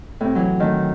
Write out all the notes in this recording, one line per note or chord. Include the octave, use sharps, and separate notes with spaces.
A2 C3
E3 F#3
D#3 A3